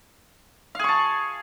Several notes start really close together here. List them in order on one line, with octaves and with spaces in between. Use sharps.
F5 G#4 C#6 A5